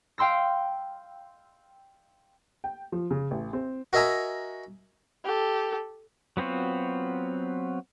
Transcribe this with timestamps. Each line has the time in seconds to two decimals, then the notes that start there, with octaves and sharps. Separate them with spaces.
0.18 F5 G5 C6 E6 A#6
2.64 G5
2.92 F3
3.11 C#3
3.31 A1
3.53 C4
3.93 F#4 A#4 D#5 E5 G#5 A#5
5.25 G4 A4
6.37 F#3 B3 C4 F4 F#4